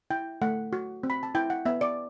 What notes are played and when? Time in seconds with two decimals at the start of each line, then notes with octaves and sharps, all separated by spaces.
0.10 E4 G5
0.42 A3 F#5
0.73 F#4
1.03 C4
1.10 B5
1.23 A5
1.35 E4 G5
1.50 F#5
1.65 B3 E5
1.81 D5